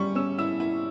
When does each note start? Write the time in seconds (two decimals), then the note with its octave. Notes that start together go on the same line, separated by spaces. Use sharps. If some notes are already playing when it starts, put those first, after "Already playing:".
Already playing: G3 C#4 C#6
0.15 C#4 E6
0.38 E4 E6
0.60 E4